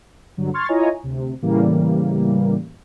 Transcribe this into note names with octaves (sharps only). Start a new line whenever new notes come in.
G2 D3 F#3
C6 C#6 F6 G#6 A6
E4 F4 C#5 D#5 G#5 A#5
D2 C3
A2 C#3 E3 G3 A#3